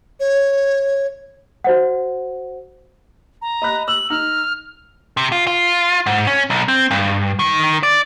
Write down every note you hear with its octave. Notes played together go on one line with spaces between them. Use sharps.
C#5
F#4 C5 F#5
A#5
D#5 B5 F#6
E6 F#7
D#4 F6
C3
F4
F4
G#2
C#4
B1
C4
G2
D#3
D5